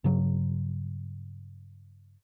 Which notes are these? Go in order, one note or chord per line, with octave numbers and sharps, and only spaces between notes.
G2 C#3 F#3